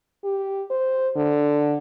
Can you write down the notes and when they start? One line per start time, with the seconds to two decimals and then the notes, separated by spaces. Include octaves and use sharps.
0.24 G4
0.71 C5
1.16 D3